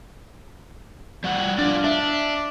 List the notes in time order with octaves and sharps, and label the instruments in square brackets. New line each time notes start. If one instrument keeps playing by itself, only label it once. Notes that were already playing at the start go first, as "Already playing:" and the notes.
[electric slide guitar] G3 F#4 F#5
[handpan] D4 [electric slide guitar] F4 D5
[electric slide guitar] D4 [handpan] E5